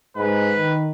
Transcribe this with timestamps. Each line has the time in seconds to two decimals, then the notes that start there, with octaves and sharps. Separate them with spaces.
0.16 G#2 B4
0.57 D#3